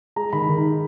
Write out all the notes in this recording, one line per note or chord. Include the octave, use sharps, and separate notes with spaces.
G#3 A#5
D#3 B5
D#3